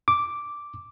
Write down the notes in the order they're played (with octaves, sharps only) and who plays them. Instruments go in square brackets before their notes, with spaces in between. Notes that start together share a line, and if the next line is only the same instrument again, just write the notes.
[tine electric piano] D6